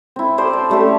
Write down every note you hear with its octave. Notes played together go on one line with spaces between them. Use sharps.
C4 E4
C5 D5 A5
D5
G3 A3 C#4 G4